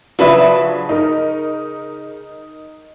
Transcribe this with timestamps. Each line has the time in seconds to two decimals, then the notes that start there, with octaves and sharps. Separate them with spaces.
0.19 C#3 F3 F#3 D4 B4 E5
0.89 D#4 A#4